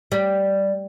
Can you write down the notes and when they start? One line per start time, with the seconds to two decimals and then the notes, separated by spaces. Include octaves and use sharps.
0.12 G3